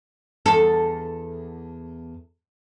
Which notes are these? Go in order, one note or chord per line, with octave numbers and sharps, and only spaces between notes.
E2 A4